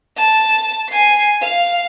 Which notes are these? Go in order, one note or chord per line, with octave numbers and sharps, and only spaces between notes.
A5
G#5 C7
F5